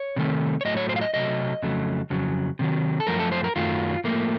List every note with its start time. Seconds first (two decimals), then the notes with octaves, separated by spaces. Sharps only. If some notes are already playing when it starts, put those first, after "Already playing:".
Already playing: C#5
0.16 C3 D#3 A3
0.61 C#5
0.65 A2 F#3 A3 D#5
0.77 C#5
0.89 C5
0.96 F5
1.01 D#5
1.13 C3 F#3 A3 D#5
1.62 F2 C#3 F#3 A3
2.10 F2 C#3 F#3
2.59 C3 D#3 F#3
3.00 A4
3.07 F#2 F3 A3 A#4
3.19 A4
3.32 C5
3.44 A#4
3.56 F#2 D#3 F#3 A3 F4
4.04 A2 F3 A3 A#3